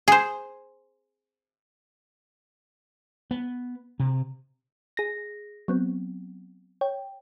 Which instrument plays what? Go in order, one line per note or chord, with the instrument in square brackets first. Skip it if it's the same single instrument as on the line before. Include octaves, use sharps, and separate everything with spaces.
[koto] G#4 C5
[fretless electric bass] B3
C3
[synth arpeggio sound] G#4 A#6
F#3 B3 C4
C#5 G5